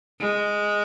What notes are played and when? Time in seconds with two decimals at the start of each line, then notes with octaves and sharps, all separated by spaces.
0.20 G#3